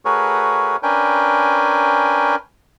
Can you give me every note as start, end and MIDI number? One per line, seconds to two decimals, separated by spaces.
0.05 0.76 57
0.05 0.76 66
0.05 0.76 68
0.05 0.76 70
0.05 0.76 71
0.05 0.76 73
0.83 2.36 61
0.83 2.36 62
0.83 2.36 70
0.83 2.36 71
0.83 2.36 79
0.83 2.36 80